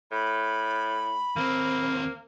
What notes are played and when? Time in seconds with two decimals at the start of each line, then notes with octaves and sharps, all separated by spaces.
0.12 A2 B5
1.36 D#2 A#3 C4